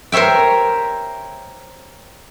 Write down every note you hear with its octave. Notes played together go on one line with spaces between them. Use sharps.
A#4 C5 C#5 E5 G5